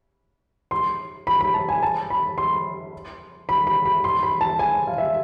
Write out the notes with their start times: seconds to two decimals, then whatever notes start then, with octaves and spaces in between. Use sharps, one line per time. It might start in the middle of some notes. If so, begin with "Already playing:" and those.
0.71 C6
1.27 B5
1.41 B5
1.54 A5
1.69 G#5
1.83 A5
2.10 B5
2.38 C6
3.49 B5
3.67 B5
3.85 B5
4.04 C6
4.23 B5
4.41 A5
4.59 G#5
4.87 F5
4.98 E5